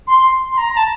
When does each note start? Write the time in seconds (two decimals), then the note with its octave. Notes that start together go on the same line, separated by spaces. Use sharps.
0.07 C6
0.52 C6
0.57 A#5
0.77 A5